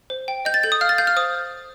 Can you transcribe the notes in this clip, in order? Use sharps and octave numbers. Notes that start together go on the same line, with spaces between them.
C5
G5
D#5 G6
A6
A4 G6
D#6
F5 F6
A6
F5 G6
F6
C5 D#6